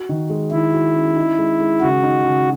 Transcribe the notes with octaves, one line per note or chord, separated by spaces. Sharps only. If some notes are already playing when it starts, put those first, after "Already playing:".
Already playing: F#4
D#3
G#3
D#3 E4
F#4
C#4
D#4
G#3
G#3
C#3 F#4
D#4
C#3